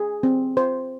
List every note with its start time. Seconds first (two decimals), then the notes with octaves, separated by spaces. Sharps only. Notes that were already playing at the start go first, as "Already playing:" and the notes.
Already playing: G#4
0.23 C4
0.57 C5